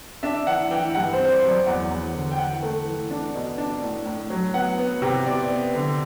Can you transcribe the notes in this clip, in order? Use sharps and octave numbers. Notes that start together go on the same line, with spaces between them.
D4 E5
E3 F#5
E3 G5
G2 F#5
C5
C4
C5
D5
F#3
D5
E2 F#5
E2
D3
G5
E3 F#5
A3
E3
D4
B2
D4
A2
A2
F#3
B3 F#5
B3
C3
B3 D5
B3
D3